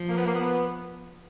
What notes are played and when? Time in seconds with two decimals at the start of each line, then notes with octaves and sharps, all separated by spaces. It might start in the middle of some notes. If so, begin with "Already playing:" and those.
Already playing: F3
0.09 A#3
0.17 B3
0.26 A#3
0.34 B3